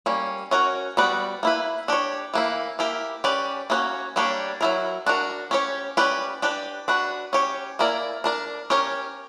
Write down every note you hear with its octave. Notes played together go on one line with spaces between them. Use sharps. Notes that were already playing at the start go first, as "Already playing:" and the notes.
G3 A#3 C#4
C#4 F#4 A#4 C#5
G3 B3 F#4 B4 D5
A#3 E4 B4
D4 G4 C#5
E3 A#3 E4
A#3 E4 G4 A#4
C#4 G4 B4 D5
A#3 C#4 F#4 A#4 C#5
G3 A#3 D4 G4 C#5
F#3 A#3 E4 A#4
D4 F#4 A#4
C#4 G4 C#5
C#4 G4 B4 D5
D4 G4 B4 D5
D4 F#4 B4
C#4 G4 C#5
A#3 E4 A#4 D5
D4 A#4 D5
C#4 G4 A#4 C#5